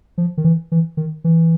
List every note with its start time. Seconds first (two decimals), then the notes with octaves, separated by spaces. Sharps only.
0.18 F3
0.37 D#3
0.44 E3
0.72 E3
0.97 D#3
1.24 E3